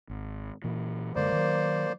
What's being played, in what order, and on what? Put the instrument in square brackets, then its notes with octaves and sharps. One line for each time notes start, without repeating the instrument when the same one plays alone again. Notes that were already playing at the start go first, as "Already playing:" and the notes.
[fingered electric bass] G#1
A#2 E3
[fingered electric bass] F#2 D3 G#3 [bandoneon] A#3 C5 D5
[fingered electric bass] D#3 F#3